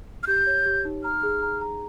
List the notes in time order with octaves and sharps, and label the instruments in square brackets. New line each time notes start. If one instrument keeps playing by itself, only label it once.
[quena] F6
[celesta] G4 [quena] G6
[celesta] C#5
G4
D#4
[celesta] A#5 [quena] F6
[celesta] G#4
A#5
A#5